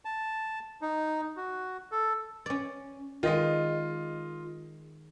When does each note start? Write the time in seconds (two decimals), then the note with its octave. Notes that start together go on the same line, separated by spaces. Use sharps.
0.05 A5
0.81 D#4
1.37 F#4
1.92 A4
2.46 C#4 D5
3.23 D#3 G#3 F4 D#5